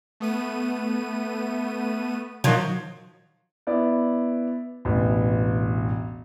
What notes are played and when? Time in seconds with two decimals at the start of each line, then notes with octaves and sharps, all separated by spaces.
0.20 A3 B3 D#7
2.44 D#3 F3 F#3
3.67 B3 E4 D5
4.85 E1 A1 E4